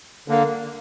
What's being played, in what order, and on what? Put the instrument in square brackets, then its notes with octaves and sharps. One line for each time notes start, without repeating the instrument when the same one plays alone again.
[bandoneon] D3 A#3